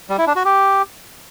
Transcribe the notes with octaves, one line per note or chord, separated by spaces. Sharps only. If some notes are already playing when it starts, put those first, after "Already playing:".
G3
E4
D4
F#4
G4